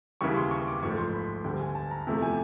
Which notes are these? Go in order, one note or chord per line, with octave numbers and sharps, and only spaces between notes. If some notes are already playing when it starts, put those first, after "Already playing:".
D#2 C#3 E3 G3 C#6
C6
C#6
D6
A1 G#2 F3 A3 C#6
C6
B5
D2 D3 G3 G5
G#5
A5
A#5
E2 C3 F3 A3
G#5